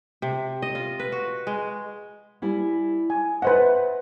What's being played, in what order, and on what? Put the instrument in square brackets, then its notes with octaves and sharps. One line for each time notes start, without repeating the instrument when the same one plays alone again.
[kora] C3
D#5
F4
B4
F#4
G#3
[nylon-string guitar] G3 E4 G#5
[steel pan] G#5
[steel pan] B4 C5 F#5 [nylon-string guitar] D#5 E5